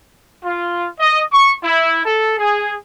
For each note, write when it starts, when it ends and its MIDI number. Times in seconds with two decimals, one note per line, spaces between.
0.44 0.87 65
1.00 1.21 75
1.33 1.53 85
1.63 2.01 64
2.04 2.34 69
2.38 2.74 68